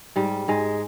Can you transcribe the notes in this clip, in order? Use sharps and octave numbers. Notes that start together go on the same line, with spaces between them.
G#2 G3
G#2 G#3